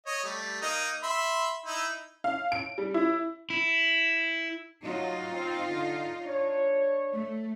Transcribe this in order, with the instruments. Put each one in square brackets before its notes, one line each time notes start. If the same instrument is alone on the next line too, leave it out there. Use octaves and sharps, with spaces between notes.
[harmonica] C#5 D#5
G3 A3
A#3 D#4 D#5
E5 B5 C6
D#4 E4
[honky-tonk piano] F5
D7
G3
E4
[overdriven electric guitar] E4
[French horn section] F#3 [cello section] D#4 F4
[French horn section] C4
D3
D4 C#5
[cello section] A3